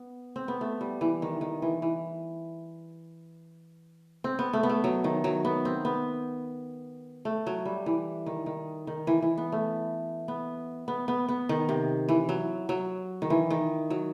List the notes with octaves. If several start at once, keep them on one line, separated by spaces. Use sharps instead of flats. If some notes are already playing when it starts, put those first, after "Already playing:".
Already playing: B3
C4
B3
A3
G3
E3
D#3
D#3
E3
E3
C4
B3
A3
B3
A3
F#3
D#3
F#3
B3
C4
B3
A3
F#3
G3
E3
D#3
D#3
D#3
E3
E3
B3
A3
B3
B3
B3
B3
D#3
C3
E3
F#3
F#3
D#3
E3
D#3
F#3